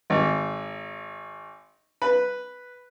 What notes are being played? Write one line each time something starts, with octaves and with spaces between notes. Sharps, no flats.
G#1
B4